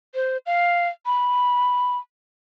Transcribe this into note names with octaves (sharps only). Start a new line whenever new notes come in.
C5
F5
B5